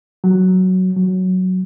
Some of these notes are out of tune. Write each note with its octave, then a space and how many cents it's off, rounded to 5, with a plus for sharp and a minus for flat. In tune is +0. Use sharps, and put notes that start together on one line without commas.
F#3 +5
F#3 +0